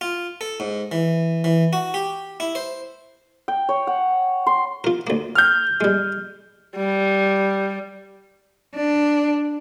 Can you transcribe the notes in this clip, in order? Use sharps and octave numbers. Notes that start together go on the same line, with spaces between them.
F4
A4
G#2
E3
E3
F#4
G4
E4
C5
G5
C#5
F#5
C6
F4 A#4
D2 A#3
F6 G6
G3 G#3
G3
D4